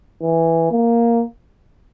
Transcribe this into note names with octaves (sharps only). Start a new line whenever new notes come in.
E3
A#3